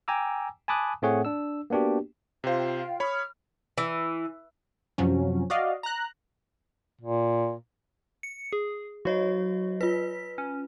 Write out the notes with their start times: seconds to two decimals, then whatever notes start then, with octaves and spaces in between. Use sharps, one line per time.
0.08 G5 G#5 A#5 D6 E6
0.68 G#5 A5 B5 D6 D#6 F#6
1.02 A2 A3 C4 G#4 C#5 F#5
1.25 D4 E6
1.70 A#3 B3 D4 F#4 G4
2.44 C3 F4 C5 F5 G5
3.00 C#5 B5 D#6 F6
3.78 E3
4.98 F#2 C3 F3 F#3 C#4
5.50 F#4 D5 D#5 F5
5.83 A#5 F#6
7.01 A#2
8.23 C#7
8.53 G#4
9.05 F#3 F#4 C#5 D#5
9.81 F4 B4 B6
10.38 C#4